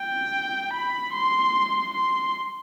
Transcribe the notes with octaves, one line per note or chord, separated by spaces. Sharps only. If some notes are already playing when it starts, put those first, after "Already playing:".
Already playing: G5
B5
C6
C6